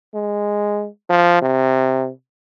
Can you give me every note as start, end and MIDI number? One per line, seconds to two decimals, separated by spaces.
0.14 0.87 56
1.09 1.38 53
1.42 2.09 48